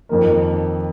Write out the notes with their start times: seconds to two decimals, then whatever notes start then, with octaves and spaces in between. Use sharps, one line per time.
0.09 F2 D#3 A#3